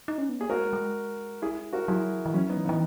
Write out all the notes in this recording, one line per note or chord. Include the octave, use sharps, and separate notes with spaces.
D#4
C#4
B3
A#3 G#4
G#3 F#4 A#4
G#3
E4 G#4
F#4 A#4
F#3 E4 G#4
E3
F#3 C#4 E4
B3 D#4
E3
B3
E3